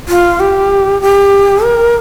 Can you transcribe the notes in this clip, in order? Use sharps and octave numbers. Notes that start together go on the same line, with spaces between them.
F4
G4
G4
A#4